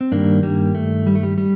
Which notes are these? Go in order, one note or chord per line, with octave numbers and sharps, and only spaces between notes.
C4
G2 D#3 G3 A#3 D4
G3 A#3
A3
G3
A3
G3
G3